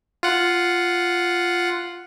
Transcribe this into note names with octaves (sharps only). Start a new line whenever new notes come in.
F4 F#5